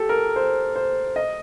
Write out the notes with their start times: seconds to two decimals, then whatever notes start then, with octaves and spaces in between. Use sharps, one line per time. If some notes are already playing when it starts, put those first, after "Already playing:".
Already playing: G4 A4
0.09 A#4
0.36 C5
0.76 C5
1.16 D#5